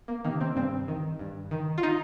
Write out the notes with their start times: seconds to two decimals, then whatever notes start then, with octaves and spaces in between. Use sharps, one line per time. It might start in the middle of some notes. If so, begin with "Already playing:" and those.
0.08 A#3
0.24 C3 D#3 A#3
0.41 C4
0.56 G2 C4
0.88 D#3
1.19 G2
1.51 D#3
1.78 F4
1.83 D#4